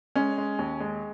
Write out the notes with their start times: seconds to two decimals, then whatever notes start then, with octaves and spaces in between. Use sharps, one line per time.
0.16 G#3 C#4
0.38 G#3
0.59 D#2
0.80 G#3